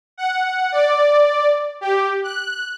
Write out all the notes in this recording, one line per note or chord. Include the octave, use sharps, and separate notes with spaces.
F#5
D5
G4
F#6